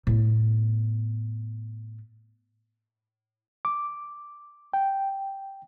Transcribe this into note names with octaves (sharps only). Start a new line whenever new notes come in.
A2 B3
D6
G5